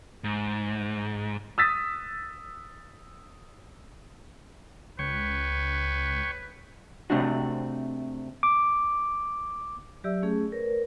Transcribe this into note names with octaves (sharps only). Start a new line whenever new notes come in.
G#2
D#6 E6 A6 B6
C#2 B4 C#5 G5 C#6
C3 A3 C4 D4 F#4
D6
F#3 G4 D5 E5 E6
A3 C#4 G#4
A#4 B4 C#5